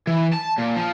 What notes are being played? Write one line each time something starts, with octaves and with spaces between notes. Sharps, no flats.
E3
A5
A#2
F3